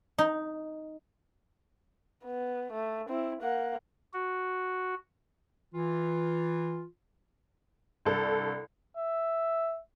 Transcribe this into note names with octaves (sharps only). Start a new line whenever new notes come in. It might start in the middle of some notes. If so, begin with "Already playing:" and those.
D#4
B3
A3
C4 E4
A#3 F#5
F#4
E3 F4
C2 G2 A4
E5